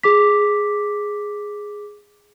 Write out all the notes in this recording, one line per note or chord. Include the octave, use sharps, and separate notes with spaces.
G#4 D6 B6